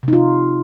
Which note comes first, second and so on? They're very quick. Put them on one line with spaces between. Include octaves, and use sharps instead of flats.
C3 D#4 F4